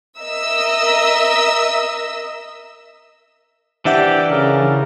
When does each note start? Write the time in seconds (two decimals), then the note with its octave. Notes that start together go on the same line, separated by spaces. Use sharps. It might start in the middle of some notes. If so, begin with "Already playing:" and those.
0.19 A#4 D#5 E5 E6
3.85 E3 D4 G4 C5 E5 F#5
4.31 C#3 A#4